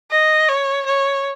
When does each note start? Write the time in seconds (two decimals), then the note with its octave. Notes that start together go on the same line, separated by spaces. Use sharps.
0.11 D#5
0.48 C#5
0.86 C#5